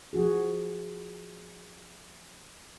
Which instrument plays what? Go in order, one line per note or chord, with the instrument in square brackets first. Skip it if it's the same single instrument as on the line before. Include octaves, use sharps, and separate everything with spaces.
[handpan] F3 F#4 G#4